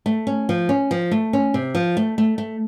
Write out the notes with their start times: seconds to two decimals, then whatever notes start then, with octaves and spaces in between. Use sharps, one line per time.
0.06 A3
0.27 C#4
0.49 F3
0.69 C#4
0.91 F3
1.12 A3
1.33 C#4
1.54 C3
1.75 F3
1.97 A3
2.18 A3
2.38 A3